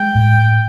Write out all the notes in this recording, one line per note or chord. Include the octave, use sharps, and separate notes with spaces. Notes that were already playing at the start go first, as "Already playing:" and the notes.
Already playing: G#3 G5
A2